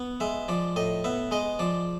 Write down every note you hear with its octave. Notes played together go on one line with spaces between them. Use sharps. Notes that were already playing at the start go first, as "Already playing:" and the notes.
Already playing: B3
G#3 E5
F3 D5
A2 D#5
B3 E5
G#3 D#5
F3 D5